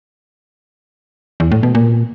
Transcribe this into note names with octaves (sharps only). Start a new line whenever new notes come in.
E2
A2
B2
A#2